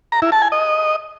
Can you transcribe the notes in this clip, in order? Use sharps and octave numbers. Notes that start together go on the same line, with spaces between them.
A#5
E4
A5
G#5
D#5